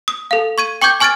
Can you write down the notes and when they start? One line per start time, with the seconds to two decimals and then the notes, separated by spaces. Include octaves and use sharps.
0.08 D#6
0.31 A4 F5
0.58 C#6 G#6 D#7
0.82 G5 C#6 D6 G6 G#6
1.00 G#5 C#6 F6 G#6 A6 D7